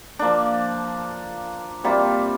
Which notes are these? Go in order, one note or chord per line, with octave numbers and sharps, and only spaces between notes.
F3 A#3 D4
C3 G3 A#3 F4